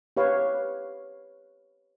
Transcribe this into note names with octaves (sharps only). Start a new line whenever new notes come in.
G4 B4 C#5 F5